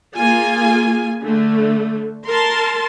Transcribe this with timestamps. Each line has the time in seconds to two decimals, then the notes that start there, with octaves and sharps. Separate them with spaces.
0.17 A#3 F4 G#4 G#5
1.22 D3 A3
2.28 A#4 A5 C6